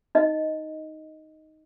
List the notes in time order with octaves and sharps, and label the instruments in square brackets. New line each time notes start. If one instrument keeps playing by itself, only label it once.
[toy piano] D#4 D#5